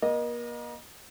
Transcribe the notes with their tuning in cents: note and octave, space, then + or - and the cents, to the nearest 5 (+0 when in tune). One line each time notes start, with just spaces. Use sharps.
A#3 +40 D#5 -15